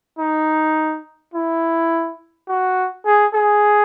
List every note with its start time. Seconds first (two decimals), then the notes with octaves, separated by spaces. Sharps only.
0.19 D#4
1.34 E4
2.48 F#4
3.06 G#4
3.34 G#4